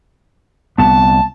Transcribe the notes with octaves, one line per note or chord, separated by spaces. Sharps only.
C2 B3 A5